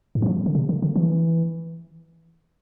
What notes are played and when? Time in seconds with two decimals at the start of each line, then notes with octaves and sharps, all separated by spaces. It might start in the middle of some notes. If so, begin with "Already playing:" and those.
0.15 G#2
0.22 E3
0.26 F3
0.46 D3
0.55 C3
0.69 D3
0.82 D3
0.96 E3